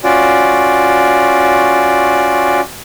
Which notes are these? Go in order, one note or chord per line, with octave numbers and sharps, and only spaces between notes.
C#4 F4 F#4 D5